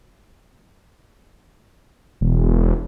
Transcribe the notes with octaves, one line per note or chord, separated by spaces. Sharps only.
E1